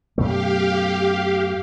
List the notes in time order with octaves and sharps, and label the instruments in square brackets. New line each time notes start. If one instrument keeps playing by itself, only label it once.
[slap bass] F#2 B2 A3 [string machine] G4 F5